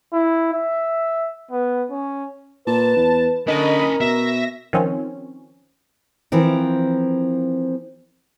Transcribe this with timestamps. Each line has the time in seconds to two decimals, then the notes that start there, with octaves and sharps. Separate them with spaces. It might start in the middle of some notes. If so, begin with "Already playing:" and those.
0.13 E4
0.53 E5
1.51 B3
1.91 C#4
2.67 A#2 B4 A5
2.97 E2
3.48 D3 C#4 A#4 D#5 A5 B5
4.01 B2 E5 A#6
4.73 D#3 F3 C4 C#4
6.32 E3 F3 C4 A#4